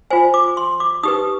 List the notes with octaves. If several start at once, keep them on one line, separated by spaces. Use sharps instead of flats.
F4 C5 G#5
D6
C6
D6
D#4 G4 B4 D#6